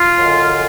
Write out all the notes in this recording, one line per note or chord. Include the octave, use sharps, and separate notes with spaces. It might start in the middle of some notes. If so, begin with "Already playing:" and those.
Already playing: F4
F#2 D3 G#3